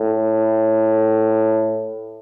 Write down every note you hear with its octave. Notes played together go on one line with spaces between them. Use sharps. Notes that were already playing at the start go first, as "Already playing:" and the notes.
Already playing: A2